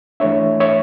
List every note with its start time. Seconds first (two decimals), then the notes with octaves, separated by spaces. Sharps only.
0.20 E3 A3 D4 C#5 E5
0.60 C#5 E5